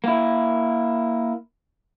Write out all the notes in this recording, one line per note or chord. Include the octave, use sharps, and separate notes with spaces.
A#3 E4